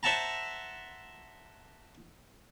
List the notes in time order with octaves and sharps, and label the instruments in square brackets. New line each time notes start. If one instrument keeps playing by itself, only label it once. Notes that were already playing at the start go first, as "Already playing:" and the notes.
[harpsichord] C5 E5 F#5 A5 A#5